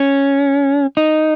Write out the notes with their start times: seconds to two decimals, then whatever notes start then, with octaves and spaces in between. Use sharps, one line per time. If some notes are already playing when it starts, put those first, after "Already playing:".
Already playing: C#4
0.97 D#4